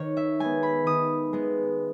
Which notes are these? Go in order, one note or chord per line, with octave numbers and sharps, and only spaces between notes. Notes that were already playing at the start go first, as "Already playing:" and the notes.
Already playing: D#3 C#5
E5
G#3 B3 G#5
B5
D#3 D#6
G#3 B3